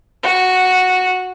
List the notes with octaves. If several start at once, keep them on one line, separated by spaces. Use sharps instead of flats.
F#4